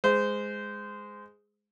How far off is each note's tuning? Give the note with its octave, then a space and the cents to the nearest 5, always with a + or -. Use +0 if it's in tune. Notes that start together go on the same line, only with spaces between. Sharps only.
G#3 +0 C5 -20